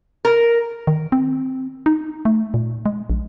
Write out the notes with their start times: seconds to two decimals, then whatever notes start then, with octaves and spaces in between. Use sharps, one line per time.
0.25 A#4
0.87 D#3
1.12 C4
1.86 D#4
2.25 A3
2.54 A#2
2.86 G#3
3.10 A#1